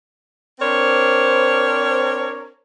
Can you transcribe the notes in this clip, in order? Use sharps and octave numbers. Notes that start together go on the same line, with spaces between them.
C4 D4 A#4 C5 C#5